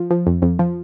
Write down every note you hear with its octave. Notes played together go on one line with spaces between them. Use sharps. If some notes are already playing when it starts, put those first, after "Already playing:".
Already playing: F3
F3
F2
F2
F3